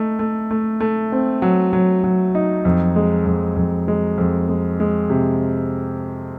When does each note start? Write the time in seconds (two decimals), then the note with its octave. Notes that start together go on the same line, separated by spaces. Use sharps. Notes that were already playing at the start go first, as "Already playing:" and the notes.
Already playing: A3 D#4
0.19 A3
0.51 A3
0.80 A3
1.12 C4
1.42 F#3
1.73 F#3
2.04 F#3
2.35 D#4
2.65 F2
2.96 G#3
3.26 F2
3.56 F2
3.88 G#3
4.18 F2
4.49 G#3
4.80 G#3
5.10 C3